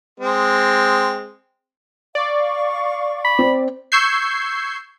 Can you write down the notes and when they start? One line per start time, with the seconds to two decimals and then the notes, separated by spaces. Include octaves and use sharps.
0.20 G#3 C4
2.15 D5 F5 C#6
3.25 B5
3.39 C4
3.92 C#6 E6 G6 G#6 C7